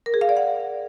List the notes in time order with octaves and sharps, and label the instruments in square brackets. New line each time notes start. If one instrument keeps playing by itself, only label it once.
[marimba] A#4
G#4
F5
D5
F#5